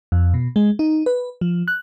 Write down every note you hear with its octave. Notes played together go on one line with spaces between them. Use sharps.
F2
B2
G#3
D#4
B4
F3
F#6